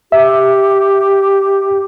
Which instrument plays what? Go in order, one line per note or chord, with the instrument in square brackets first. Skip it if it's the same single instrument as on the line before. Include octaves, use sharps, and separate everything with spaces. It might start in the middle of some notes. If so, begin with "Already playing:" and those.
[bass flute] G4 [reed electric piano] E5